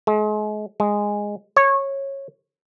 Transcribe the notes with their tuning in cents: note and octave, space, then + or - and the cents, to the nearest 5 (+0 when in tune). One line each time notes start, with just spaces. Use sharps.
G#3 +35
G#3 -10
C#5 -15